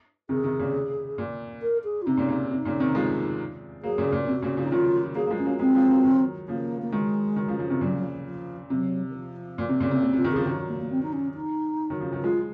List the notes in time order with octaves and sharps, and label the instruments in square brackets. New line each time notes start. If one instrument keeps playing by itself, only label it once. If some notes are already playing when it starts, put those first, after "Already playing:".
[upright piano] C3 D#3 [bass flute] G#4
[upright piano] C3 D#3
A#2 C#3
A#2
[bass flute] A#4
G#4
F4
[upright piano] C3 [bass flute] D#4
[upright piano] A#2 C#3
A#2 C#3
[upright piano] C3 [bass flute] D#4
[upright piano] A#2 C#3
C3 D#3
F3 G#3
[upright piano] F#3 A#3 [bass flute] G#4
[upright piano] A#2 C#3
A#2
[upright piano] C3 [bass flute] F#4
[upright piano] A#2 C#3
C#3 F3
[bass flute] D#4
[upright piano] D#3 F#3 [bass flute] F4
[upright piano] F#3 A#3 [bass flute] G#4
[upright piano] A#3
F3 G#3
[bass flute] C#4
[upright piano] F#3 A#3
[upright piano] F3 G#3 [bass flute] C4
[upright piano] F#3
F3 G#3
F#3 A#3
D#3 F#3
[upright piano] C#3 F3 [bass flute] A#3
[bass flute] A#3
[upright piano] D#3 F#3 [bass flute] G#3
[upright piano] D#3 F#3
C#3 F3
C#3 F3
C3 D#3
[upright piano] A#2 C#3 [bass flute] F#3
[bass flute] F#3
F3
F3
[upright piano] C3 [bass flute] F#3
[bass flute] D#3
F3
[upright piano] A#2
C3
A#2 C#3
C3
[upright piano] C3 [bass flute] A#3
[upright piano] C3
[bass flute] F4
[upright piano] C3 D#3
[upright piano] C#3 F3 [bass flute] G#4
[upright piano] D#3 F#3 [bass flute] F#4
[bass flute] A#3
A#3
C4
D#4
C#4
D#4
[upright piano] D#3 F#3
C#3 F3
D#3 F#3
[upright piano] F3 G#3 [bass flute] F4